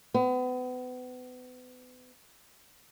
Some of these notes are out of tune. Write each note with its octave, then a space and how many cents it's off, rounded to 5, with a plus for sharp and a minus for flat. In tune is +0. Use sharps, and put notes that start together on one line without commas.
B3 +35